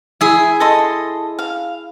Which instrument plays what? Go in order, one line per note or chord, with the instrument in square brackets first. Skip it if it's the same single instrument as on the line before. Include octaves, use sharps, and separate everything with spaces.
[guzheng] E4 G#4 [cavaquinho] E5
[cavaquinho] A4 D#5 C6
F5